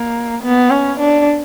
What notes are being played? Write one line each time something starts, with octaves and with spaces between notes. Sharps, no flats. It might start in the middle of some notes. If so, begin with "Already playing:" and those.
Already playing: A#3
B3
C#4
D4